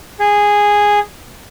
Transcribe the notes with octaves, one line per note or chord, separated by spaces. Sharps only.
G#4